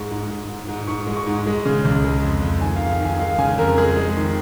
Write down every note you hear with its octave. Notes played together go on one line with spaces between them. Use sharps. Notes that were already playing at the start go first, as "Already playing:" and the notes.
Already playing: G#2 G#3 C#6
G#2
G#2
G#2
G#2
G#2 C#6
G#3
C#6
G#2
G#3
C#3
C#2
G#3
F2
F2
D#3 G#5
G#2 F5
F5
D#3
G#5
G#3 F5
C#3 G#5
F2 A#4
G#3 G#4
G#3
D#3